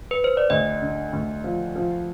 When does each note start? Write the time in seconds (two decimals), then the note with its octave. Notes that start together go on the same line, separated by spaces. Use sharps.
0.11 B4
0.24 C5
0.37 D5
0.50 D2 D#5
0.82 D3
1.13 D2
1.44 F3
1.76 F3